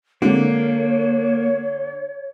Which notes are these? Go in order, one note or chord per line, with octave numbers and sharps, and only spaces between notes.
D3 G#3 A#3 C4 F#4 C#5